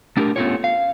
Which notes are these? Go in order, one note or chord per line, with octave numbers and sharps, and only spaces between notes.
A3 D4 G4 G#4 A#4
A3 B3 C#4 F4 G4 C#5
F5